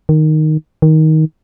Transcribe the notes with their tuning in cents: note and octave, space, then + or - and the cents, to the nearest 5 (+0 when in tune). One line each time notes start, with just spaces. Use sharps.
D#3 -5
D#3 +15